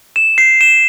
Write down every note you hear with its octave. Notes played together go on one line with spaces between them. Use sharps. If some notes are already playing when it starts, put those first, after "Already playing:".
E7
C7
E7